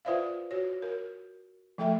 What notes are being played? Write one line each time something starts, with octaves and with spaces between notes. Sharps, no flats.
F4 B4 C5 D5 E5 F5
F#4 C#5
A#4
F3 A3 A4 E5 G5